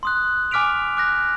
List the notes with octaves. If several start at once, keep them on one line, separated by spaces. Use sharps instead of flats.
C6 D#6 F#6
G#5 D6 F6 B6 D7 F7
D6 F#6 A#6